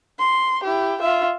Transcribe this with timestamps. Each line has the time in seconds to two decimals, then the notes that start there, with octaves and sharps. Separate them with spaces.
0.19 C6
0.64 E4 G4
1.01 F4 E5